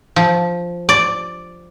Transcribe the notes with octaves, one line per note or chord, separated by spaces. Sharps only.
F3
D5